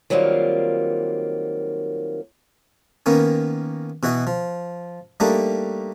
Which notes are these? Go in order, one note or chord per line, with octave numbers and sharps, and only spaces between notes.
D#3 F#3 G3 A#3 C4 F4
D#3 A#3 B3 C#4
B2 E3 F#4 D#5
F3
G3 A3 A#3 D4 D#4